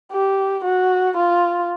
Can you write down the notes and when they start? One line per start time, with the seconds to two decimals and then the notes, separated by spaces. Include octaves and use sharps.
0.12 G4
0.64 F#4
1.17 F4